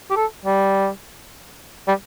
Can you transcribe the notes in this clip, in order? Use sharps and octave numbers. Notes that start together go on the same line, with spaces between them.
G4
A4
G3
G3